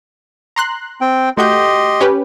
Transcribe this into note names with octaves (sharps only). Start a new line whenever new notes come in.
A#5 C6 F#6
C4 G5
A3 F#4 G4 D#5 C6 G6
C#4 G4 B4